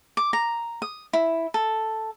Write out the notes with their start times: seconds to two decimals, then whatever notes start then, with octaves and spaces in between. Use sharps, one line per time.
0.17 D6
0.33 A#5
0.82 D#6
1.13 E4
1.54 A4